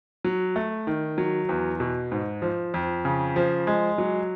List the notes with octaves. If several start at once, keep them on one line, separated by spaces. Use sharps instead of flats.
F#3
A3
D#3
F#3
E2
B2
G#2
F3
F2
C#3
F3
G#3
F#3